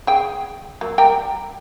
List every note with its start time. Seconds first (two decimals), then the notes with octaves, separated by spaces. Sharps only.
0.07 G#4 G5
0.81 F#3 A#3
0.98 G3 A#4 G5